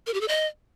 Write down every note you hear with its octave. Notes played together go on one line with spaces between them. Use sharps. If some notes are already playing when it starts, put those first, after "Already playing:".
A#4
G4
A4
D#5